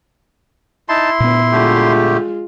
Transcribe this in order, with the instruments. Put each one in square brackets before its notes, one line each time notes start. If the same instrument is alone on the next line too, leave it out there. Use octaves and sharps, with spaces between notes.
[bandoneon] D#4 A5 [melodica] E4 C6
[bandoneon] D2 [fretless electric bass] A#2 B3
[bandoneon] D3 A3 G4 [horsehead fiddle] G#3 F4